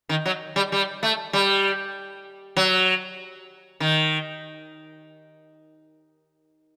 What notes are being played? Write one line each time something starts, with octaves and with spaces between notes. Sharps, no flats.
D#3
F#3
G3
G3
A3
G3
F#3
D#3